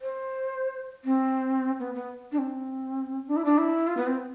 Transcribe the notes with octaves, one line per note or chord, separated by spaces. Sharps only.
C5
C4
B3
B3
D4
C4
D4
E4
D4
E4
F4
B3
C4